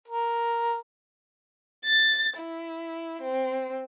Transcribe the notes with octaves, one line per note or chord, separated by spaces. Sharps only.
A#4
A6
E4
C4